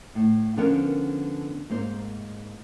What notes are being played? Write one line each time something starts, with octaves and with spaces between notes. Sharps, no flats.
A2
D3 F3 B3 C#4 A#4 G5
G#2 A#3 C4 C5